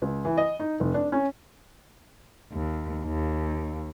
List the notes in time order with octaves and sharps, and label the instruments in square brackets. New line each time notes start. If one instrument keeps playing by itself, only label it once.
[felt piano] C#2
E3
D#5
D#4
F1
D4
C#4
[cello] D#2
D#2